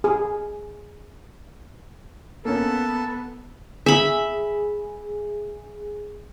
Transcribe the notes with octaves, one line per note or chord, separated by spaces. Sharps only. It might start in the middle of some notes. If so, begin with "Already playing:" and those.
G#4
A#3 B3 C#4 A4
G#4 E5 B5